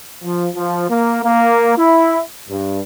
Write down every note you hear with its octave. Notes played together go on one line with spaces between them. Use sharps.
F3
F3
A#3
A#3
E4
G2